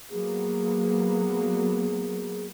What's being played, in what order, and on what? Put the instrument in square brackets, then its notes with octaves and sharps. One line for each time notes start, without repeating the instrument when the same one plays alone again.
[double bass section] F#3 A#3 B3 [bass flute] G#4